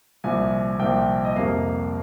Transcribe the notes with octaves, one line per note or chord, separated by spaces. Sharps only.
C2 A#2 F3 G#5
C2 A#2 F3 G5
D#5
F2 C3 G3 A#3 F5